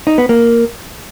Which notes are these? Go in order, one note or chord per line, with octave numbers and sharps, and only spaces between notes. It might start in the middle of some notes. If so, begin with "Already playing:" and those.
D#4
B3
A#3